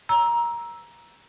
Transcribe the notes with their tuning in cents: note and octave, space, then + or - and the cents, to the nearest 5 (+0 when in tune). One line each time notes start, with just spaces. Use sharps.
A#5 +15 E6 +0